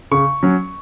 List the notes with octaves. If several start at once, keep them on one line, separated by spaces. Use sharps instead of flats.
C#3 C#6
F#3 C#4